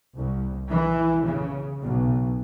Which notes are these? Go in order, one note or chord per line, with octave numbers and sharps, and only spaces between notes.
C2
E3
C#3
B1